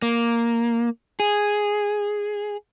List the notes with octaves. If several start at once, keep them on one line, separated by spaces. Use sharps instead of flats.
A#3
G#4